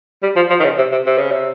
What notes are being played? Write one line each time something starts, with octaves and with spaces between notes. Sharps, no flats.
G3
F3
F3
D#3
C#3
C3
C3
C3
C#3
C3